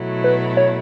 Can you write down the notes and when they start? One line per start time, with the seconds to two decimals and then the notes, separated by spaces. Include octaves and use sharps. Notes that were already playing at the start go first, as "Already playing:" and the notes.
Already playing: B2 F#3 A3 E4
0.24 B4
0.57 C#5